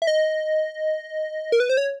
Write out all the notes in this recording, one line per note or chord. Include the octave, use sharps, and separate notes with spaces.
E5
D#5
A#4
B4
C5
C#5